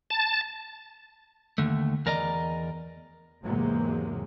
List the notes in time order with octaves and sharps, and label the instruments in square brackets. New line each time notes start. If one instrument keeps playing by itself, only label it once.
[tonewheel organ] A5
[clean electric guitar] D#2 G#2 D3 A3
E2 A#4 D5 D#5 A#5
[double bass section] E2 G#2 C3 F#3 G#3 A#3